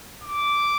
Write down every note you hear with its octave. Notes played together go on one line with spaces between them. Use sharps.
D6